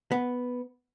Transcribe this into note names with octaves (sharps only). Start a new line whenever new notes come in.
B3